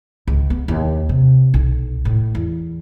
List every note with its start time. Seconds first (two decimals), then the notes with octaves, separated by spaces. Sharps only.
0.28 C#2
0.50 B3
0.68 D#2
1.09 C3
1.54 B1
2.05 A2
2.35 E2